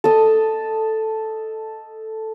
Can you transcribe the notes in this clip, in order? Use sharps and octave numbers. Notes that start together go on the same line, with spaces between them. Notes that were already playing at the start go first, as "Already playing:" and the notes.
A4 D#5